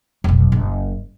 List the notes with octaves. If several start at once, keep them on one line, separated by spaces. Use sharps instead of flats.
F1 B1
F#1